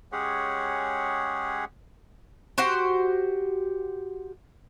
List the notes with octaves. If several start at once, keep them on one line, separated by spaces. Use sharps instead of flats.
G#3 C#4 G4 G#4 C#5 F#5
F#4 G4 C5 F#5